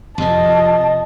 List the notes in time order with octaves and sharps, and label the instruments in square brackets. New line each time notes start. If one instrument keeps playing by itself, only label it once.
[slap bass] F2 C3 F3 [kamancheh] D#5 A5